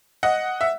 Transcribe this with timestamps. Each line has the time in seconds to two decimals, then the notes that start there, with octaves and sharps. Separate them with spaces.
0.23 D#5 F#5
0.61 E5